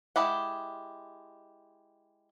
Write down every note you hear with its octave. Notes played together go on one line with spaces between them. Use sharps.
G#3 E4 G4 F#5